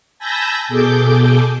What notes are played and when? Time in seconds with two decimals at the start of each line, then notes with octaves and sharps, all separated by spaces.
0.19 G#5 A5 B5 E6 G6 A#6
0.69 B2 G#4 A4 D6 G6